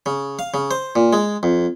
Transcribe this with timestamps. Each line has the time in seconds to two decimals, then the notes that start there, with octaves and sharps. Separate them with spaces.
0.06 C#3
0.39 F5
0.54 C#3
0.71 C5
0.96 A#2
1.13 G#3
1.43 F2